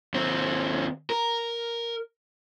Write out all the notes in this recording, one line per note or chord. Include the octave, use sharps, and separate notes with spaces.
D#2 C4
A#4